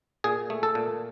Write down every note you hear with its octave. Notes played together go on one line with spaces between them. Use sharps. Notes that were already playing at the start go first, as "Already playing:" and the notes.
A#2 G#4
A3
A4
A#2